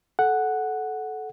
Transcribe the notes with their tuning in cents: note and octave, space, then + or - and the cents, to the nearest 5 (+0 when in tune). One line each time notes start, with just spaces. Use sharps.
A4 -20 F#5 +0